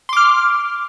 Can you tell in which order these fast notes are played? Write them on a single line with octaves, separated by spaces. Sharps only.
C6 D6 F6